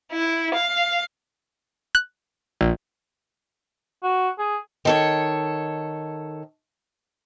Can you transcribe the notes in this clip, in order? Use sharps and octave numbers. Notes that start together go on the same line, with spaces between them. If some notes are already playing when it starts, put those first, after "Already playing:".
E4
F5
F#6
A#1
F#4
G#4
D#3 A4 C#5